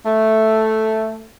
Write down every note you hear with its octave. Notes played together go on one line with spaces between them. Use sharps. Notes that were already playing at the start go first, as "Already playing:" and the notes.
A3